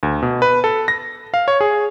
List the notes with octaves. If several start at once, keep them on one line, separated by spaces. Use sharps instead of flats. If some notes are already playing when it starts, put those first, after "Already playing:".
D2
B2
B4
A4
A#6
F5
C#5
G#4